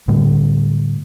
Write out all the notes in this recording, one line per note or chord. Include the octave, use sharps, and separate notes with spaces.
A2 D3 G3 A3